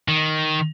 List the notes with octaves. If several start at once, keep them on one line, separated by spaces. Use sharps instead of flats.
D#3